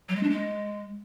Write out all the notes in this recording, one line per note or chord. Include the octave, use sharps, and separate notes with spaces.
F#3
G#3
D4
G#3